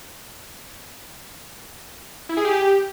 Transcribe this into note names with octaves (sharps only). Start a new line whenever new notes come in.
E4
G#4
G4